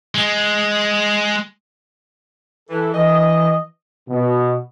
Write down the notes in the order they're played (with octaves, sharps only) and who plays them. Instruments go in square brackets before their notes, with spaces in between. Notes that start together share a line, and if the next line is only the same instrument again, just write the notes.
[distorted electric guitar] G#3
[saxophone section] E3 [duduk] A4
[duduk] E3 [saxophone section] D#5
[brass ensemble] B2